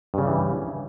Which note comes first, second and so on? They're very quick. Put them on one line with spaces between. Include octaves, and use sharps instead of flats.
G2 C#3 G3 E3